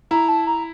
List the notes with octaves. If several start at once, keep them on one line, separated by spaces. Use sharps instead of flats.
E4 A#5
A5
A#5